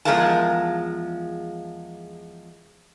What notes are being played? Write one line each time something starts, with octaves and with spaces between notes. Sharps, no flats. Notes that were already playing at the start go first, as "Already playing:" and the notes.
E2 F3 G#3 A#4 F5 A5